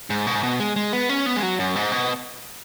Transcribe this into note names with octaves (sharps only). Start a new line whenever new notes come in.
G#2
B2
G#2
B2
G#3
G#3
B3
C#4
B3
G#3
F#3
F#2
G#2
B2